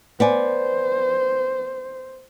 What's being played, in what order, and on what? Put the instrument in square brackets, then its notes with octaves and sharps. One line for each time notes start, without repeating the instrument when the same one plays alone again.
[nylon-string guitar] B3 D5 G#5 [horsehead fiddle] C5